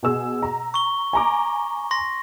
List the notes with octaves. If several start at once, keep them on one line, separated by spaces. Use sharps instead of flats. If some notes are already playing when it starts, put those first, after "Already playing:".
B2 G#4 E6
A#5
C#6 G7
G#5 A#5 D6
C6 A#6